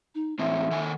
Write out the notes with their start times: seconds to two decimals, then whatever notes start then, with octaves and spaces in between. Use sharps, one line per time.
0.15 D#4
0.39 A2 E3 C4 E5
0.71 D#3 A4 G#5